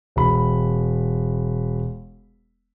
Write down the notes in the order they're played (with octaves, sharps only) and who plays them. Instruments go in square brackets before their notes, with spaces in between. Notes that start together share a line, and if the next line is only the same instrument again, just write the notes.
[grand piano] E1 B5